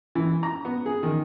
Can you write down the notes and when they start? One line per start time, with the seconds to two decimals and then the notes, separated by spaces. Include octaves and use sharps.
0.15 E3
0.43 A#5
0.65 B3
0.86 G#4
1.03 D#3